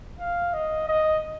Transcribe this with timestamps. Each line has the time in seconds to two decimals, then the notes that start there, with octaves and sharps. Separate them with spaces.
0.19 F5
0.53 D#5
0.89 D#5